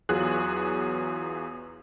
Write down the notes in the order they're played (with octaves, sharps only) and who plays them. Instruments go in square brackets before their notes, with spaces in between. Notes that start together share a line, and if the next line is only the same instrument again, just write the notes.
[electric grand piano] E2 F#3 F4 F#4 G#4 F#6